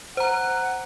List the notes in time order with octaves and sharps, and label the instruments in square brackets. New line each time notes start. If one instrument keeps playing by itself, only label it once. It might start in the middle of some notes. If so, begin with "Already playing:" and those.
[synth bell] C5 A#5 [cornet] F#5